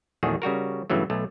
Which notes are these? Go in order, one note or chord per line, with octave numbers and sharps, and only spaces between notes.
A#1 E2 D#3 A3 F#4 G#4
C#3 G3 F#4 A#4
G2 C#3 E3 F#3 A3
B1 A3